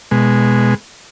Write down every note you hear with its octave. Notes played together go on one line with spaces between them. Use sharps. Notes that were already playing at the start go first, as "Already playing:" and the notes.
B2 G#3